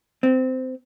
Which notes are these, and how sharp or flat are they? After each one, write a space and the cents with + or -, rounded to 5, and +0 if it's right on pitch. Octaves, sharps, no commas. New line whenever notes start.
C4 -20